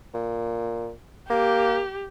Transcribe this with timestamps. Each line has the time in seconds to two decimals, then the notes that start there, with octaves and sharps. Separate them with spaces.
0.14 A#2
1.30 A#3 G4